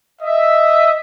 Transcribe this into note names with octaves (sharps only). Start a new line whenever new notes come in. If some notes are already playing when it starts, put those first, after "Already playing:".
D#5 E5